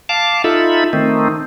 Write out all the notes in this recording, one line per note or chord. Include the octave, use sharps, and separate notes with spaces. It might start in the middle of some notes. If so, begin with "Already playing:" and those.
F5 A5 D6
D#4 F4 A4 E5 B5
D#3 A3 C4 D#4